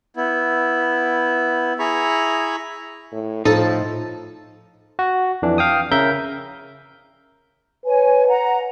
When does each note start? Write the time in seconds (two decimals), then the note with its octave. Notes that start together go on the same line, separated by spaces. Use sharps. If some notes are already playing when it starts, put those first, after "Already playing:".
0.17 B3 E4
1.79 E4 G#4 A#5 B5 C#6
3.12 A2
3.46 A2 F3 D#4 A4
4.99 F#4
5.42 F2 E3 D4
5.58 F5 G5 D#6
5.91 C#3 A#4 E5 G6
7.85 B4 C#5 G#5
8.28 F#5 A#5